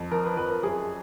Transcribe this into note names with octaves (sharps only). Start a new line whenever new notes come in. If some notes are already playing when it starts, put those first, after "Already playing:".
Already playing: F2
F3 A#4
B4
F2 B4
A#4
F#2 G#4